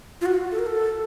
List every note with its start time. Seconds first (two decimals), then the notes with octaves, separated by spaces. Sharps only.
0.21 F4
0.26 F#4
0.52 A4
0.59 A#4
0.66 A4